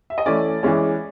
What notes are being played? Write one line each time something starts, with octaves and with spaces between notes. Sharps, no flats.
E5
D#5
E3 A3 C#4 D5
E3 G#3 C#4